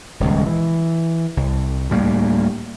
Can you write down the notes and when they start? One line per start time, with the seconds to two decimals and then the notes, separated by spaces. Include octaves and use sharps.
0.20 D#1 C#2
0.46 E3
1.37 C2
1.90 D2 A2 G3 A#3